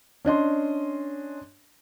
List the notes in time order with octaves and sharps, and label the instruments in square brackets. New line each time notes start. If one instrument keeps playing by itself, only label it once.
[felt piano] C#4 D4 D#5 C6